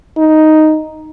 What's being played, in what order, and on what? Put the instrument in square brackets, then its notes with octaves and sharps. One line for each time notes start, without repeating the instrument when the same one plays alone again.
[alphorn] D#4